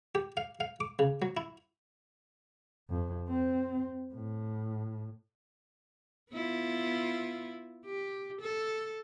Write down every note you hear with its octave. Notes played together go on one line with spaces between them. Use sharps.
G4
F5
F5
D6
C#3
F#3
E4
F2
C4
A2
B3 E4 F4
G4
A4